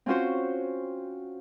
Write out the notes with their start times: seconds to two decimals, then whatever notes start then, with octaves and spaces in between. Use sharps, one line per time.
0.06 C4 C#4 F4 F#4 C5